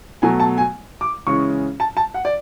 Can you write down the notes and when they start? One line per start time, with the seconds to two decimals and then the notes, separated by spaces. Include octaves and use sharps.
0.22 B2 F#3 A3 G#5
0.40 A5
0.58 G#5
1.01 D6
1.27 C#3 E3 G#3 C#4 C#6
1.80 A5
1.97 A5
2.14 F#5
2.25 D5